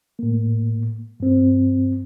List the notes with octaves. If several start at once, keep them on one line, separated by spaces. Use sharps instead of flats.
A2 A#3
G2 C4